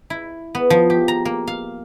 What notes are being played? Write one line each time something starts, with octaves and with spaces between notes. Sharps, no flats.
E4
B3
F3
G4
A#5
A#3
F5